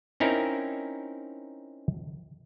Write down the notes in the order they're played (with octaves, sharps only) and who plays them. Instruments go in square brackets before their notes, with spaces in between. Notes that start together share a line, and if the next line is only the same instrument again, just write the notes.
[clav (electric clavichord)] C4 C#4 D#4 E4 A#4